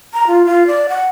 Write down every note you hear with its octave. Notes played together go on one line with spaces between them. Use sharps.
A#5
F4
F4
D5
F#5